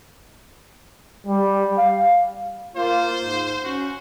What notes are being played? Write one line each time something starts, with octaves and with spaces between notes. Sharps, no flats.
G3
F5
A#3 F4 C5
G#2
C#4 F#4